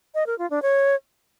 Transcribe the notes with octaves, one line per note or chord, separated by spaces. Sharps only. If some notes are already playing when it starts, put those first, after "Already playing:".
D#5
A#4
F4
D4
C#5